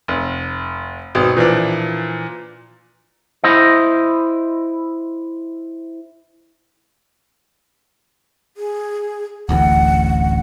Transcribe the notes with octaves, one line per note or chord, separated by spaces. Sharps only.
F1
G#1 B2
A#2 E3 F3 D4
E4 C5 D#5
G#4
D1 A1 D2 F#5